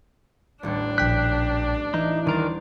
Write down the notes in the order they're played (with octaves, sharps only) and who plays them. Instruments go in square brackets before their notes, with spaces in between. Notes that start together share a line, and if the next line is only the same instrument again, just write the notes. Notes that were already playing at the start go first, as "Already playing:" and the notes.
[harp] D#1 A1 A4 [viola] D4
[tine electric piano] A#1 G5 B6 [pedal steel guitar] F#6
[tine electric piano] E3 [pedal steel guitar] D#4 [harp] E4
[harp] D#1 C6 A6 [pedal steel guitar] D#3 A#4